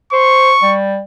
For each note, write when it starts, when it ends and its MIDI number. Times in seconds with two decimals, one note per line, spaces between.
0.12 0.51 72
0.12 0.75 85
0.62 1.00 55